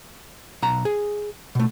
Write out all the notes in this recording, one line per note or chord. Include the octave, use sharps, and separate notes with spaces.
B1 F#5 A#5
G#4
B2 A3